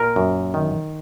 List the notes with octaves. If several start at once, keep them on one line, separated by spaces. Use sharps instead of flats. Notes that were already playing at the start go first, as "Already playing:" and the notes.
Already playing: A#2 A#4
F#2
D#3